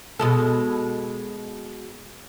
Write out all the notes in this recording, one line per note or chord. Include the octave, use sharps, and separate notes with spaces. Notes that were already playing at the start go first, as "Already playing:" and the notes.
B2 G#3 A4